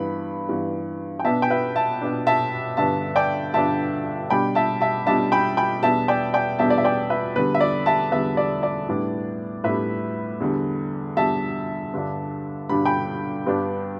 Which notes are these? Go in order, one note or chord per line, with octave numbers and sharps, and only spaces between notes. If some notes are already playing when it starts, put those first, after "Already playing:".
Already playing: G2 E3 B3 B5
G2 E3 B3
G5
B2 B3 D4 E5 A5
G5
B4 E5
E5 A5
B2 B3 D4
E5 A5
G2 D3 B3 D4 E5 A5
D5 G5
G2 D3 B3 D4 E5 A5
B2 G3 D4 G5 B5
E5 A5
E5 A5
B2 G3 D4 E5 A5
G5 B5
G5 B5
E2 B2 G3 B3 D4 E5 A5
D5 G5
D5 G5
E2 B2 G3 B3 D4 E5 A5
D5
E5
D5 G5
B4 E5
E2 D3 G3 B4
E5
D5
E5 A5
E2 D3 G3 B4 E5
D5
D5
A2 G3 B3 D4
A2 G3 B3 D4 B4 E5
E2 D3 G3
E2 D3 G3 E5 A5
G2 D3 G3 D4
G2 D3 G3 D4 B5
G5 B5
G2 G3 B3 D4